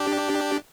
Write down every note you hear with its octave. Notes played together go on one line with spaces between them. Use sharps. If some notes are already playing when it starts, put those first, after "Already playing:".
Already playing: D4 G4